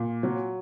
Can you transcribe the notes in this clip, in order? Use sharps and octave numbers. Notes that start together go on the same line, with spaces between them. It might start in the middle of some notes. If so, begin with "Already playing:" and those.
Already playing: A#2
F#3